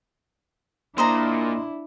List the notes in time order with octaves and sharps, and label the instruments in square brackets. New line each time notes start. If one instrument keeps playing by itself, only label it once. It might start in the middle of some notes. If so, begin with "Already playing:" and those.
[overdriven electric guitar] A#2 A#3 [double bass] D4 E4 [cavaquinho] C5 D#5 A#5